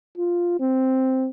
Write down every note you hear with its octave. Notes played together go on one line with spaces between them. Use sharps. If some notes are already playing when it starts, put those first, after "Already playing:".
F4
C4